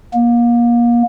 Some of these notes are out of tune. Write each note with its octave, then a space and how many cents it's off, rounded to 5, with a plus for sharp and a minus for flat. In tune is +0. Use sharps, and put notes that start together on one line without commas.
A#3 +30